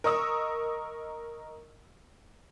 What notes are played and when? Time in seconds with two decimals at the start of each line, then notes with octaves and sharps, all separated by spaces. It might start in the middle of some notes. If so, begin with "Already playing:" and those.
0.04 A#4 D#5 C#6 D#6 E6